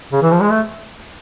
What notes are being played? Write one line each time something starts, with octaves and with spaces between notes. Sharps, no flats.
C#3
E3
F3
G#3
A3